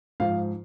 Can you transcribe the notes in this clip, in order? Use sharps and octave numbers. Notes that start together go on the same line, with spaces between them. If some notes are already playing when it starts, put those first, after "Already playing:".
G#2 F3 F5